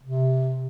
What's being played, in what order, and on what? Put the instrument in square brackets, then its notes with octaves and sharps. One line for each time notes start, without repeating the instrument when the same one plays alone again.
[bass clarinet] C3